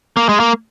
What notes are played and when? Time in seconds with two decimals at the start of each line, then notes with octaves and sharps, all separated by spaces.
0.17 A#3
0.29 G#3
0.40 A#3